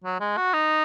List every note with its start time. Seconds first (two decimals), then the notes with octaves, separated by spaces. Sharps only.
0.04 F#3
0.20 G#3
0.37 F#4
0.54 D#4